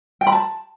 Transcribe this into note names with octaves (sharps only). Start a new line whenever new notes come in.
G5
B5
A5